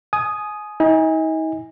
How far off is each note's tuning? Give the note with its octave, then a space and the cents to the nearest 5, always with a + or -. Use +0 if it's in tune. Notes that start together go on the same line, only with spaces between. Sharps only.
G#5 +25 D#6 +0
D#4 +40 G#5 -25